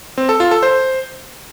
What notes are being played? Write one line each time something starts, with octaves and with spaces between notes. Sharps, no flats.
C4
A4
F4
A4
C5